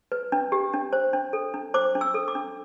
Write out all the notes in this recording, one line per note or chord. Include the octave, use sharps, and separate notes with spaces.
B4
D4
G4
D4
C5
D4
A4
D4
C5 D6
D4
E6
A4
D6
D4